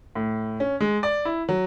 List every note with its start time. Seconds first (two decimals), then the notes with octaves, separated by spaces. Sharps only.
0.15 A2
0.60 C#4
0.80 G#3
1.03 D5
1.25 E4
1.49 F#3